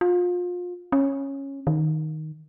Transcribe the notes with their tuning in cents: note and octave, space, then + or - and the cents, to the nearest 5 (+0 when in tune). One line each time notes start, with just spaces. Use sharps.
F4 +30
C#4 -10
D#3 +0